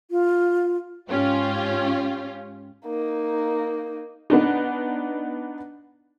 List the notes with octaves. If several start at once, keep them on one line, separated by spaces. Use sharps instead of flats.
F4
G#2 C#4 F4 G4
A#3 D#4
B3 D4 D#4